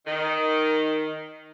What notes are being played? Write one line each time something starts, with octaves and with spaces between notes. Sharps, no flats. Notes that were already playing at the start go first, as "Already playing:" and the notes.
D#3